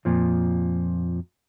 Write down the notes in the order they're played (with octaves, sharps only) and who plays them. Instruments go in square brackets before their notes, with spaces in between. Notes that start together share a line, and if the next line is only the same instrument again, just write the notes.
[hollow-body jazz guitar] F2 A#2 F3